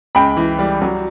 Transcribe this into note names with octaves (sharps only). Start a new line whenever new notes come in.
C#2 G5 B5
E3
G3
F#3